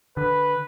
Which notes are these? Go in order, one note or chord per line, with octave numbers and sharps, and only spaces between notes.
D3 B4